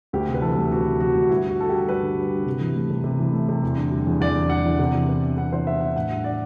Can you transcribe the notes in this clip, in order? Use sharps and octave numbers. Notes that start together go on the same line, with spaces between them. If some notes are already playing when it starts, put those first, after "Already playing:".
D2 G4
C3
B4
E3 A4
D2
D2 F#4
C3
E3 F#4
D2
G2 E4
D3 F#4
G3 A4
G4
G2
A4
G2 B4
D3
G3
G2
C3
E3
A3
C3
C3
E3
A3
C3
E2
D3
G3
E2
E2 D5
D3
G3 F#5
E2
C3
E3
B3
D4
C3 F#5
E3 C5
B3 E5
D4 F#5
A2 F#5
G3
D4 D5